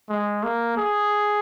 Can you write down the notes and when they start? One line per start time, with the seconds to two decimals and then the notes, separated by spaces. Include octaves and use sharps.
0.09 G#3
0.43 A#3
0.77 G#4